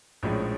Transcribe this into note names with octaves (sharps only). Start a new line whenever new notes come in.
A#1 A2 F3 G#3 C#4